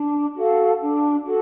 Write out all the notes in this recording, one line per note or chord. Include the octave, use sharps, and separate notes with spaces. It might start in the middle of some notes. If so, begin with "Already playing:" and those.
Already playing: D4
F#4 A4 F5
D4
F#4 A4